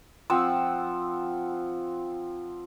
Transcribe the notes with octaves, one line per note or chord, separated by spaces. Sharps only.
F3 C4 F#5 E6